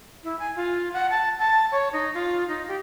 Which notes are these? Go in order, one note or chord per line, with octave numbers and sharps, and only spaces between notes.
E4
G#5
F4
F#5
A5
A5
C#5
D#4
F4
D#4
G4